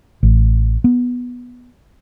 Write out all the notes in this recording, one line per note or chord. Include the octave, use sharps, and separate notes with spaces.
A1
B3